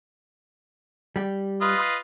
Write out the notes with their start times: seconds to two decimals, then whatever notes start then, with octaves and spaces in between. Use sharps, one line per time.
1.16 G3 G4
1.61 F4 B4 D#5